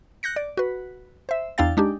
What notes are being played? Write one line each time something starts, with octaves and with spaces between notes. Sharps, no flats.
F#6 G6 A#6 C#7
D5
F#4 B4
C5 E5
E2 D4 E4 F5 G5 A6
G#3 D4 D#4 G4